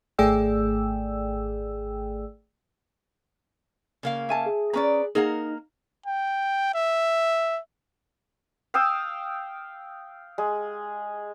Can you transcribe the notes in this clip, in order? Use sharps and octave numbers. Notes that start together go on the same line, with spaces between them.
G#1 A3 G#4 D5 G5 E6
C#3 A#3 F5
E5 G#5 A5
G#4
C#4 B4 D5 A#5
A#3 D#4 G#4 A#4 F#5
G5
E5
F5 G5 D#6 E6
G#3